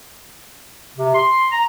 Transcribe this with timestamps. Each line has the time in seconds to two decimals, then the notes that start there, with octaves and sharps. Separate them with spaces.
0.98 C3
1.14 C6
1.51 A#5